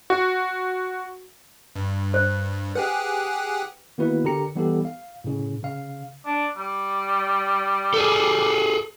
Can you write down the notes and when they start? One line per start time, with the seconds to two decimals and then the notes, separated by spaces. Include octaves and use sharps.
0.10 F#4
1.76 G2
2.14 C5
2.75 G4 G#4 B4 F#5
3.98 D#3 A#3 B3 E4 F#4 B4
4.24 D3 G4 A#4 A#5 C#7
4.56 E3 G3 B3 D#4 G4 A4
4.85 F5
5.24 A2 C#3
5.63 C#3 F5
6.26 D4
6.57 G3
7.94 G#4 A4